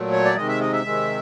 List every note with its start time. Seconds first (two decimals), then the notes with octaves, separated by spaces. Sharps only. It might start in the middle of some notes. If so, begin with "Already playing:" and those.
Already playing: A#2 F#3 A3
0.12 C#5
0.25 D5
0.36 C3 D#3 G#3 D#5
0.48 E5
0.61 D#5
0.73 E5
0.85 C3 D#3 G#3